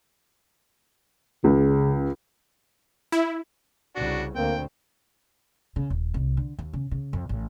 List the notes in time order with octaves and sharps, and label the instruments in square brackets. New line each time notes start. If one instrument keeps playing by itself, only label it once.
[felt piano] C#2 [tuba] C#3
[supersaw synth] E4
[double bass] C2 C#3 [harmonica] D4 F#4
[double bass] D2 C4 [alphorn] A#3 [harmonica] G5
[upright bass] C#3
D#1
C2
D3
D#2
C#3
C#3
F2
A1